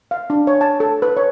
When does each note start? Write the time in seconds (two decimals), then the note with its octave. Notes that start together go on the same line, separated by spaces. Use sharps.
0.11 F5
0.30 D4
0.47 C#5
0.61 A5
0.80 A4
1.02 B4
1.17 C#5